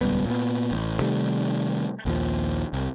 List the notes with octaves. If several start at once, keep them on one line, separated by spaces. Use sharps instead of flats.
D#1 C#2 G3 B3
A#2 B3
A1
C3 D#3 G3 A3
A#1 D#2 F3
C2